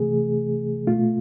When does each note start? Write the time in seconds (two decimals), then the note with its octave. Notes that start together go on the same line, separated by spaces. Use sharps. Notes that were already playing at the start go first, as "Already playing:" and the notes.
Already playing: C3 E3 A3 G#4
0.87 B2 A3 F4